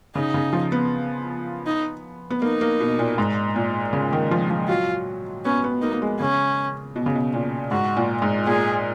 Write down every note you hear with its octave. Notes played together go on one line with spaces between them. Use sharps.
C#3 D#4
C#3
F3
B3
D#4
B3
A#3 D#4
A#3
B2
A#2
G#2
A#2
C#3
D#3
F3
F3
F#3 F4
B3 C#4
B3
A#3 D#4
A#3
G#3
C#3 C#4
B2
C#3
B2
A#2
G#2 F#4
A#2
G#2
A#2 G#4